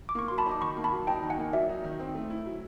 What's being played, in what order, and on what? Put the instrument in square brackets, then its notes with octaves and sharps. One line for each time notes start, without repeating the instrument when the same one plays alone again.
[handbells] D6
[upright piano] A#3 [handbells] C#6
[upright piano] F#3 [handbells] C6
[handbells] A5 B5
[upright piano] D#4
[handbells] D6
[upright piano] D#3 [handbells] B5 C#6
[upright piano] A#3
[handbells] A5 B5
[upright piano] F#3
[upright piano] D#4 [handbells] G5 A5
[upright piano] D#3
[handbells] F#5 G#5
[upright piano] A#3
[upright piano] F#3 [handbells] D5 E5
[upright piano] D#4
D#3
C4
A3
E4
F#3